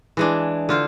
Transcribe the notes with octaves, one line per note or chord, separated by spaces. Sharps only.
E3 G#3 D4
D3 F4 C5